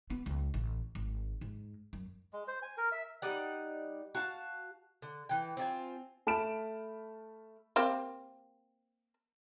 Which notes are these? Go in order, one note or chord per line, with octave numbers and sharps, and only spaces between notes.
B3
C#2
A1
G#1
G#2
F#2
G#3
C5
G#5
A#4
E5
G3 D#4 D5 F#5
F#4 F5 A5
D3
E3 G5
C4 D4 F4 G#5
A3 A5 B5 F6 D7 E7
A#3 C4 G4